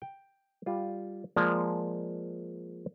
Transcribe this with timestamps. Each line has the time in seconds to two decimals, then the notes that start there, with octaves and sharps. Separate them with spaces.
0.02 G5
0.66 G3 F4
1.36 F3 G#3 A#3 D5